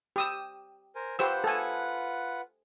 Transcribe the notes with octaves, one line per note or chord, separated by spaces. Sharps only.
G4 D#6 E6
A#4 C5 G#5
F4 G4 B4 C5 F#5 E6
A4 G#5